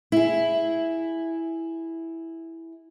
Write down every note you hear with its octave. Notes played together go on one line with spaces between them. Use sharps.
E4 G#4